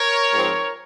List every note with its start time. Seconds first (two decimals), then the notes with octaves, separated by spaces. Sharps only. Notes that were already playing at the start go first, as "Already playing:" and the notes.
Already playing: A#4 C#5
0.33 G#2 F3 C4